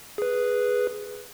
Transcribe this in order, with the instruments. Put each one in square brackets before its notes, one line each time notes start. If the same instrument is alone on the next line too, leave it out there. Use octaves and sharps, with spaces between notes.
[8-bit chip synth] G#4 B4